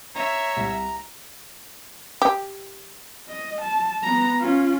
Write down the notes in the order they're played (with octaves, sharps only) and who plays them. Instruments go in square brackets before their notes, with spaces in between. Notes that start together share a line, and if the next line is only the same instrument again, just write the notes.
[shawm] C#5 [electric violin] E5 [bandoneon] A#5
[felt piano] C2
[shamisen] G4
[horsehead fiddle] D#5
A5
B3 A#5
C#4 F4